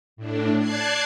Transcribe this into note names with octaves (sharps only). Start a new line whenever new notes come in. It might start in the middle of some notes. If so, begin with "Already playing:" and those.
A2 D4
D5 A5 F#6 G#6 C7